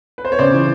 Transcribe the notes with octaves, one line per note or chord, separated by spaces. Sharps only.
B4
C5
C#5
C#3 C5 D5
E3